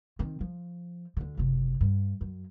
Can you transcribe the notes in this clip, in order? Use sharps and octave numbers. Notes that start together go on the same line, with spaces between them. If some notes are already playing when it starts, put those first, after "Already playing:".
D#3 C4
F3
D2 D3
F#1 C3
G2
F#2